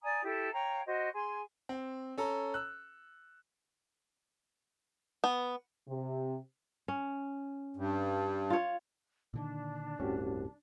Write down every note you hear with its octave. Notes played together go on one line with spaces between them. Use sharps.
D5 G#5 A#5 D#6
E4 G4 A4
C#5 F5 G5 A#5
F#4 C5 D#5
G#4 G#5 C6
C4
C#4 A4 A#5
E6 F#6
B3
C3
C#4
G2
F4 C#5
A#2 D3 D#3 D4
D1 C2 G2 A3 C#4 F#4 G4